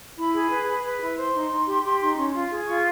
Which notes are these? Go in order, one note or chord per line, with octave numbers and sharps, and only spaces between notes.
E4 B5
G#4
B4
G#4
B4
E4
C5 C6
D#4
D#4
G4
G4
D#4
C#4
F4
G#4
F4 C#6